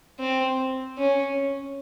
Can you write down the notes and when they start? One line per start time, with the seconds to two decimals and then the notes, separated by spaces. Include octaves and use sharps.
0.19 C4
0.98 C#4